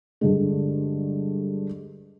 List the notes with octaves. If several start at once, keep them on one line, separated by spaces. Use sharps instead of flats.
G2 D3 G#3